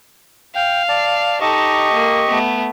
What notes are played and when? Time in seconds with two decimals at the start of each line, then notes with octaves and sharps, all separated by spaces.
0.55 F5 G5
0.89 D5 A5
1.41 D#4 G4 A4 D#5 C#6
1.93 A#3
2.29 A3 B3